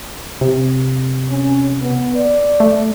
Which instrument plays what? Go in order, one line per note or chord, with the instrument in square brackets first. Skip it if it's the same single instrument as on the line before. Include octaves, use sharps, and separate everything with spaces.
[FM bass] C3
[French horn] C#4
B3
D5
[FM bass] A3